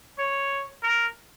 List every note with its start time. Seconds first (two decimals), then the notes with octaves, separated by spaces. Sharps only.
0.19 C#5
0.83 A#4